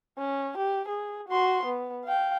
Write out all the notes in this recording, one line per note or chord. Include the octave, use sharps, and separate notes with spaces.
C#4
G4
G#4
F#4 C6
B3
F5 G5